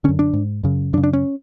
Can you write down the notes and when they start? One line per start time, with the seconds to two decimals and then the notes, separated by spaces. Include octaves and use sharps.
0.04 D3 C#4
0.09 F#2
0.19 D4
0.33 G#2
0.63 F#2 C#3
0.93 F#2 D4
0.97 C#3
1.04 D4
1.13 C#4